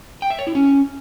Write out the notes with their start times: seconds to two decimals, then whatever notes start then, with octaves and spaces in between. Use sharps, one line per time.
0.22 G5
0.30 E5
0.39 C#5
0.47 E4
0.55 C#4